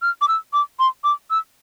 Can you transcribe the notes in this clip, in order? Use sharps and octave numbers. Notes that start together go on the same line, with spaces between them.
F6
D6
E6
D6
C6
D6
E6